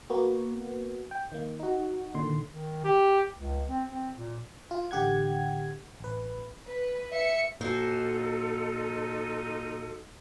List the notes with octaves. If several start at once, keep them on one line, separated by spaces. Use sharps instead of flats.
A#3 B3 F#4
G5
D#3 A#3
D#4 F#4
A#2 D3 D#3 C6
D#3
G4
C#2
C4
C4
A#2
F4
A1 D3 G4 F#5 G#6
A1 B4
B4
E5 C#7
A#2 F3 D#4 F#4 A4 C5